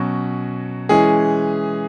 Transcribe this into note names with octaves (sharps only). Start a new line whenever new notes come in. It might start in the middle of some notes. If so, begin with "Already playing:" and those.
Already playing: B2 F#3 C#4 F#4
E3 G#3 C#4 G#4